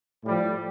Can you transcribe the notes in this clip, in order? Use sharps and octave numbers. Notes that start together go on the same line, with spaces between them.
A2 F3 G3